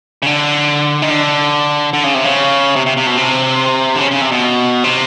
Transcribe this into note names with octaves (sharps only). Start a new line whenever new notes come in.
C#3
D3
D#3
D3
D3
C#3
C3
C#3
C3
C3
C3
B2
C3
D3
C#3
C#3
C3
B2
C3